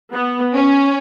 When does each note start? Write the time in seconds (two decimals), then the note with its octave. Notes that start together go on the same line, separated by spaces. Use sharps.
0.13 B3
0.54 C#4